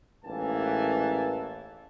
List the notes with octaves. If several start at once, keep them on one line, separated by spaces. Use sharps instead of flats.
A1 G#2 E3 A#3 G#5 A5